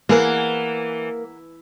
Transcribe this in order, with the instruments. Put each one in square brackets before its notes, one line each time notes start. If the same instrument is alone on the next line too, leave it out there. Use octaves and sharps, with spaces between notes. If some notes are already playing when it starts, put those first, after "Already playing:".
[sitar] E3 [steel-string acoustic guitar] A#3 [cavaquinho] G#4 A#4 F#5